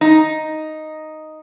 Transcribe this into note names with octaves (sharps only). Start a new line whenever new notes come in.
D#4